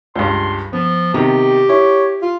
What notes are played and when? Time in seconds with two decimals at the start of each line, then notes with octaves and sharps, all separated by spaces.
0.16 C#2 G2 C6
0.73 F3 B3
1.14 C3 D#3 B3 G4
1.69 E4 C#5
2.22 F4